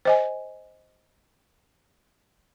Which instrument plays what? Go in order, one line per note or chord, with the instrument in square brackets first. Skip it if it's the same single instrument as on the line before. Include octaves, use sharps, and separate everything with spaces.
[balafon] C5 D#5 G#5